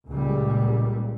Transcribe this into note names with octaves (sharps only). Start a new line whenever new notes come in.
C#2 A#2 G3